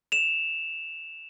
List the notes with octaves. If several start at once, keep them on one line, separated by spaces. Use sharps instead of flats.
E7 F7